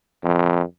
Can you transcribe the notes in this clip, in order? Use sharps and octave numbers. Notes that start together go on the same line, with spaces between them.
F2